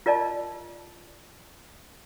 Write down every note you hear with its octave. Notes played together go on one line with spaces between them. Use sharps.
F4 A#4 D5 D#5 A5